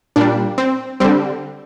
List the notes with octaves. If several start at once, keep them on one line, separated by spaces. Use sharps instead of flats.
A#2 G3 D4
C4
D3 G3 C4